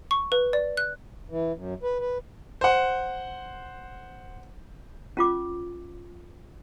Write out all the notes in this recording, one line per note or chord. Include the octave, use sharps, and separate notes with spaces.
C#6
B4
D5
F#6
E3
F#2
B4
B4
C5 F#5
C#4 F4 D6